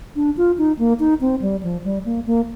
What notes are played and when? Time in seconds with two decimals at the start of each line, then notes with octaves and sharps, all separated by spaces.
0.16 D4
0.37 F4
0.58 D#4
0.79 A#3
1.00 D#4
1.21 C4
1.42 G3
1.63 F3
1.84 G3
2.05 A#3
2.26 A#3